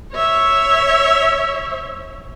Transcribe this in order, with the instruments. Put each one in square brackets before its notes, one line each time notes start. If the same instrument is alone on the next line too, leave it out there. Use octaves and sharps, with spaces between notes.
[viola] C#5 E5